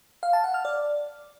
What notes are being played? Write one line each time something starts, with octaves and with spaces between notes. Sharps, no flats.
F5
A5
F#5
F6
D5